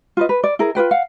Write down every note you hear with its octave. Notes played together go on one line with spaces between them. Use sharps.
F4 B4 D#5
B4
D5
E4 G#4 A#4
F4 G#4 B4 G5
F5 F#5